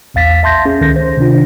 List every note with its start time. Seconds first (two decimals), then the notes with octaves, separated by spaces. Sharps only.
0.14 A#1 E2 F5 A6 B6
0.43 E5 A5 C6 G6 A#6
0.65 C#4 G#4
0.81 C#2 D#3 A4 G6 A#6
0.96 C5
1.17 C3 D#3 D4 F4